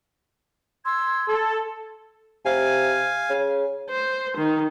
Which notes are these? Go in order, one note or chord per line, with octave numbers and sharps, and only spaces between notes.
C6 E6 G#6
A4
C3 F5 G#5
C#3
C5
D#3